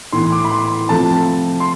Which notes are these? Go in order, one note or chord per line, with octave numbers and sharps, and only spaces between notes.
A2 E3 B3 C6
D6
B5
C6
C3 F3 A3 A5
C6